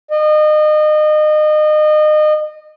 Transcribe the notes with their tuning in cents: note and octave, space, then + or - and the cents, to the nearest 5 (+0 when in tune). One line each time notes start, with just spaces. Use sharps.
D#5 -30